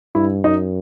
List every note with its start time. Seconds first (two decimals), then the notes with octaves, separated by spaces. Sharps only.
0.15 G2 E4
0.44 F#2 D#4